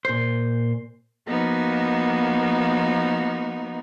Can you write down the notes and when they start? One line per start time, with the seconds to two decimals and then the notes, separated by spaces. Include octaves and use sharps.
0.05 A#2 C5
1.26 F3 A#3 B3 D#4 F#4